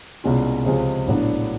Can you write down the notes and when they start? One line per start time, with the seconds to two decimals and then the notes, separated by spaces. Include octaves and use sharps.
0.24 C2 B2 G#3 C#4 F4
0.65 C#2 C3 F3 G#3 C#4
1.07 A#1 A2 F#3 B3 D4